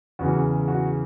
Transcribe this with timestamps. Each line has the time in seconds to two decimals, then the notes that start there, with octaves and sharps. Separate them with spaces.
0.19 E2 C#3 E3 F#4
0.68 F#4